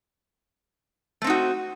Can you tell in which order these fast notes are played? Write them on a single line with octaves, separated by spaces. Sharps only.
A3 C4 D#4 F#4